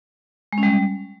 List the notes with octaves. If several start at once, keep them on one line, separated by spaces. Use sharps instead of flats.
G#3
C#4
G3